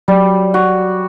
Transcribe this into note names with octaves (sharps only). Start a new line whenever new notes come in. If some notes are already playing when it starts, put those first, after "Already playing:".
F#3 G3
F#4